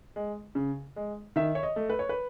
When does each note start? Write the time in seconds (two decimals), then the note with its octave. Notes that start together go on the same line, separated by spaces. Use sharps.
0.16 G#3
0.55 C#3
0.96 G#3
1.36 D#3 E5
1.55 C#5
1.63 D#5
1.76 A3
1.90 B4
1.99 C#5
2.09 B4